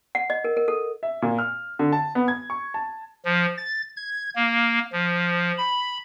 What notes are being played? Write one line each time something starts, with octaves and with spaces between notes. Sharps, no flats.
F#5
D#5
A#4
A#4
A4
E5
A#2
F6
D3
A5
B3
G#6
C#6
A5
F3
A6
G#6
A#3
F3
B5